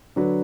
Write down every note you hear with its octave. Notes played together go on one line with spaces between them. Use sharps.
D3 F#3 D4 F#4 B4